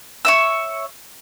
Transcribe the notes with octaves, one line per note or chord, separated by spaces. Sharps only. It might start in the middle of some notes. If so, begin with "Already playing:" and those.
C#5 E5 E6